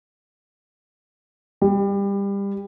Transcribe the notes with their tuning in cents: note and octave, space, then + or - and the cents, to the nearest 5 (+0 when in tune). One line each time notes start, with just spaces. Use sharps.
G3 +25